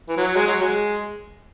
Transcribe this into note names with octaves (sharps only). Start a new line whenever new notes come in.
E3
F#3
G#3
F#3
G#3